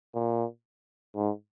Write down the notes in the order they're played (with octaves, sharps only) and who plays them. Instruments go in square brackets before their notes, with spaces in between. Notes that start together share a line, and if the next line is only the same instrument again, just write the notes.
[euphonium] A#2
G#2